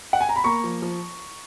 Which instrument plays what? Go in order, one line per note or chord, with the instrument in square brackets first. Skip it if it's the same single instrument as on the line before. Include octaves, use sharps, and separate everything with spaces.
[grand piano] F#5
G#5
A#5
B5
A#3 A#5 C#6
F3
F3